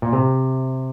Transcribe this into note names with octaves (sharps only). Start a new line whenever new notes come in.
A#2
C3